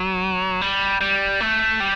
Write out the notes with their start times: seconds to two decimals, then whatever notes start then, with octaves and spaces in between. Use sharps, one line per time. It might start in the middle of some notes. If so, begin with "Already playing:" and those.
Already playing: F#3
0.61 G3
1.01 G3
1.41 A3
1.80 G3